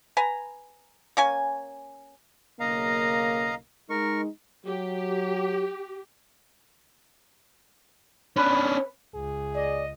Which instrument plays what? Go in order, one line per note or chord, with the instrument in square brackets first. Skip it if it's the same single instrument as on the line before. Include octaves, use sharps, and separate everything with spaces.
[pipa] B4 G#5 A#5
A#3 C#4 G#5
[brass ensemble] B1 C#3 A#3 [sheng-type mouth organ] D#5 F5 A#5
[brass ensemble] G#3 D#4 [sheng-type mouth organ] A#4 C#6
[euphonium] F#3 [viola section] G4
[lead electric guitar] C#4 D4 [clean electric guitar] B4
[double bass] C#2 [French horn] G#4
[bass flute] D5 [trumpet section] D#5